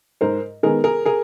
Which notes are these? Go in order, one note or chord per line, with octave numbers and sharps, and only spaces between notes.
G#2 A#4 C5
D#3 G#3 B3 G#4 A#4
G#4 A#4
G#4 A#4